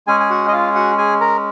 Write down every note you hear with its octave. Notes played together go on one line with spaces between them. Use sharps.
G#3 C#4 G#4 G#5
G#5
F#4 F#5
D#5
F4 F5
F#4 F#5
G#4 G#5
A#4 A#5